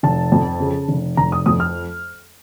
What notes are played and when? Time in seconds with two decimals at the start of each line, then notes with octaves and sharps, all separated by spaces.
0.03 F1 A5
0.32 F2
0.60 C#3
0.88 F1
1.17 F1 A#5
1.32 D#6
1.46 F2 D#6
1.60 F6